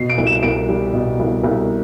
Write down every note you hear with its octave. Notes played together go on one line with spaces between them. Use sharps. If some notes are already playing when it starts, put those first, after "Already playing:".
Already playing: B2 C7
D7
C2
E7
C2 D7
G3
B2
C2
C2